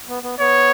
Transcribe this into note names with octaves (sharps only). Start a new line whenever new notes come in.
B3
B3
B3 C#5